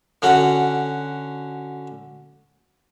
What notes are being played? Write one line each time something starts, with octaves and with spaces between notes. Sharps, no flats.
D3 C#4 F#4 F#5